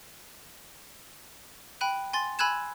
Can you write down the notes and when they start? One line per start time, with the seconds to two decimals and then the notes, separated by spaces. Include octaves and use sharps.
1.81 G5 B5 F#6 D#7
2.13 G#5 C6 A6
2.39 G#5 B5 E6 F#6 G#6 E7